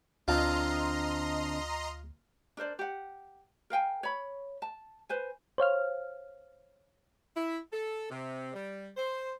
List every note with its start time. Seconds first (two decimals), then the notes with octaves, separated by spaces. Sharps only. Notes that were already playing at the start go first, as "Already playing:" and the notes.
0.28 D2 D3 C4 D4 F4 D#5 A#5 C6
2.57 D4 A#4 C5 D5
2.79 G4 F#5
3.70 A#4 F5 G5 G#5
4.03 C#5 B5
4.62 A5
5.09 B4 C5 G#5
5.58 C5 C#5 F5 F6
7.36 E4
7.72 A4
8.10 C3
8.54 G3
8.97 C5